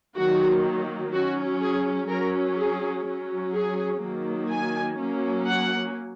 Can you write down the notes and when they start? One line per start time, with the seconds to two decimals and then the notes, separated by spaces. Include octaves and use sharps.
0.17 D#3 F#3 A#3 F#4
1.13 F#3 C#4 F#4
1.61 G#4
2.09 F#3 C#4 A#4
2.57 G#4
3.05 F#3 C#4
3.54 G#4
4.02 D#3 F#3 A#3
4.49 G#5
4.98 F#3 A#3 C#4
5.46 F#5